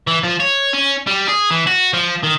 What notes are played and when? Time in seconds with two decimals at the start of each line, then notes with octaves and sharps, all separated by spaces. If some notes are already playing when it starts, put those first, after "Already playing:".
0.07 E3
0.24 F3
0.40 C#5
0.73 C#4
1.07 G3
1.28 G#4
1.51 E3
1.67 F#4
1.94 F3
2.23 D#3